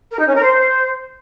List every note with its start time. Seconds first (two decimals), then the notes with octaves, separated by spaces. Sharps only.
0.10 A#4
0.18 D#4
0.26 C#4
0.34 A#4
0.42 C5